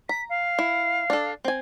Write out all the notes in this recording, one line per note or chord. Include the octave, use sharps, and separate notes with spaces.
A#5 B6
F5
E4
D4 A4
C4 G#5